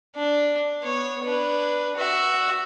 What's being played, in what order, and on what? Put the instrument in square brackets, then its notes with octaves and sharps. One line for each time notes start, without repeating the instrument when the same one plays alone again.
[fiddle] D4
B3 C#5
D4 B4
F#4 E5